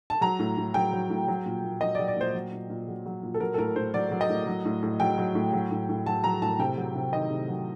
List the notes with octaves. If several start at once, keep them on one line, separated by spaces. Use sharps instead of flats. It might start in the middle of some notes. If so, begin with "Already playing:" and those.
A5
F#3 A#5
A2
A2
F#3 G5
F#3
A2
F#3
A#2
A#2
F#3 D#5
D5
F#3
D5
A#2 C5
F#3
A#2
A#2
F#3
F#3
A#2
A4
F#3 A#4
A4
A2 A#4
A2 C5
F#3 D5
F#3
D#5
A2
F#3
A2
A2
F#3 G5
F#3
A2
F#3
A2
A2
F#3 A5
F#3 A#5
A2 A5
C3 G5
F#3
C3
D#3 D#5
C3
F#3